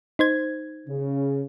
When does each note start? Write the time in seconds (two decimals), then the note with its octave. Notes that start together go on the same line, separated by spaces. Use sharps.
0.19 D#4 C5 G#6
0.87 C#3